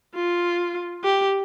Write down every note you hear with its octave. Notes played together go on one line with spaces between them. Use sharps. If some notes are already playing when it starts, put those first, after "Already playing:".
F4
G4